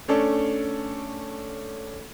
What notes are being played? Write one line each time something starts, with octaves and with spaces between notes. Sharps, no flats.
A3 C#4 D4 A4